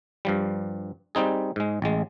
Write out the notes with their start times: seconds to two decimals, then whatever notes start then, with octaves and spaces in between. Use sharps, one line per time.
0.25 G2 F3 G3
1.15 G3 C4 D#4 G#4
1.56 G#2 G#3
1.82 A1 G#3